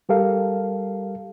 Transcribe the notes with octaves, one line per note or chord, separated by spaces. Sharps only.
G3 G4 A4 A#4 F5